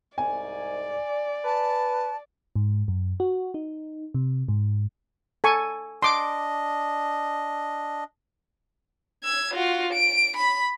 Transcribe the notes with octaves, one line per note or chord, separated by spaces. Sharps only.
C2 G#2 D5 G#5
B4 A5
G#2
F#2
F#4
D#4
C3
G#2
A4 G#5 C#6
D4 D#5 C6 D6
E6 G#6
F4 F#4
D7
B5